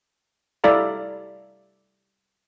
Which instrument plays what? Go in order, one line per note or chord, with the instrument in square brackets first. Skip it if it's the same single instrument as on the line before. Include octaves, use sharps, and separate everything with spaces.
[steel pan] G3 E4 A4 D5 F5 A#5